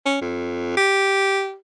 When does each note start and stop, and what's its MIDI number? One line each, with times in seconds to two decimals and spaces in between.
0.05 0.18 61
0.21 0.76 41
0.77 1.55 67